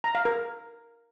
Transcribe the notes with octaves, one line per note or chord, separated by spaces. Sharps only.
A#5
F5
A#4